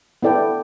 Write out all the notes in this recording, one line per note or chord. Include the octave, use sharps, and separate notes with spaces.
B3 E4 A4 D5 G5